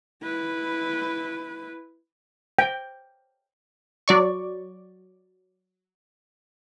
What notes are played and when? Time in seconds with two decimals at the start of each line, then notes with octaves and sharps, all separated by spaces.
0.23 E4 B4
2.59 G5
4.08 F#3 D5 C#6